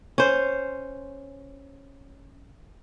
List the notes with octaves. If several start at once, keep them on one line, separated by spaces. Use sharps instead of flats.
C#4 C5